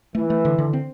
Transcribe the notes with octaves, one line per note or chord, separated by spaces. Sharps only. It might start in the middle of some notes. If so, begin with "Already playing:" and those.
E3 A3
A3
D3
D3
C4